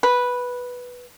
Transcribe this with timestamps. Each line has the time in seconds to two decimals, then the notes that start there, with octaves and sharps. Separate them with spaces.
0.03 B4